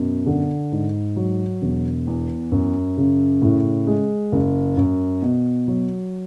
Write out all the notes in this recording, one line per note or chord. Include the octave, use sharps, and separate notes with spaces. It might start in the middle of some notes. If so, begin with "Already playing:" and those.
Already playing: F#2 B2
D3
G#2
F#3
E1
E2
F#2
C#3
A2
G#3
F#1
F#2
B2
F#3